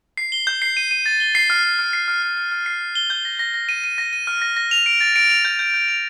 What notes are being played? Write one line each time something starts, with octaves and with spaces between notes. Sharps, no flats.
C7
G7
G6
C7
D#7
D#7
A6
G7
C7
F6
F6
F6
C7
F6
F6
F6
F6
C7
F6
G7
G6
A#6
A#6
A#6
D#7
D#7
A#6
D#7
F6
A#6
A#6
F7
D7
A6
D7
F7
G6
G6
G6
F7